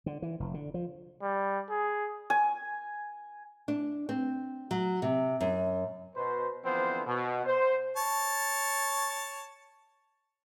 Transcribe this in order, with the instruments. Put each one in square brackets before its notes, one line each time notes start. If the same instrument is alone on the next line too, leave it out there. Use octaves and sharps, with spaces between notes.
[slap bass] D3
E3
F1
D3
F3
[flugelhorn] G3
G#4
[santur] G#5
[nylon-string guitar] D4
C4
F#3
C3
F#2
[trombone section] B2 B4 C5
D3 E3 F3 B3 C4 C5
B2
C5
[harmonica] C#5 A5